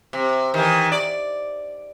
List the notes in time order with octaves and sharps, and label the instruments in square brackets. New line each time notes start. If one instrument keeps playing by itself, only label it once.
[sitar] C3
D#3 E3
D5